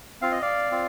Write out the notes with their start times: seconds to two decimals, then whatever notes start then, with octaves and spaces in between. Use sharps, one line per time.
0.21 C4 F4 F5
0.32 D#5
0.42 D5 F5
0.71 C4 F4